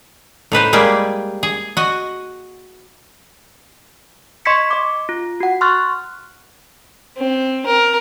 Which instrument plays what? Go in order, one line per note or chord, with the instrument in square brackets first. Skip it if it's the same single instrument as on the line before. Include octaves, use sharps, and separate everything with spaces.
[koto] A2 D#4 B4 C5
G3 G#3 A#3 G4 G#4
G#4
F#4 D#5
[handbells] D#5 C6 C#6 G#6 B6 C#7
D#5 D6
F4
F#4 F#5
C6 C#6 F6 F#6 A6
[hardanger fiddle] C4
A#4